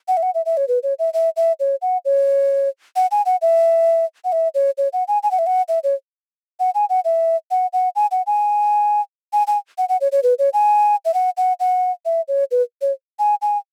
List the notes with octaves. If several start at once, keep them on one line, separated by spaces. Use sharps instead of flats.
F#5
E5
F#5
E5
E5
C#5
B4
C#5
E5
E5
E5
C#5
F#5
C#5
F#5
G#5
F#5
E5
F#5
E5
C#5
C#5
F#5
G#5
G#5
F#5
E5
F#5
E5
C#5
F#5
G#5
F#5
E5
F#5
F#5
G#5
F#5
G#5
G#5
G#5
F#5
F#5
C#5
C#5
B4
C#5
G#5
E5
F#5
F#5
F#5
E5
C#5
B4
C#5
G#5
G#5